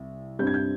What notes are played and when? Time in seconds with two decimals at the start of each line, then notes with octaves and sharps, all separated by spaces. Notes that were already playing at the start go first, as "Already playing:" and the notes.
Already playing: C2
0.39 G2 G3 C4 G6
0.47 G#6
0.54 G6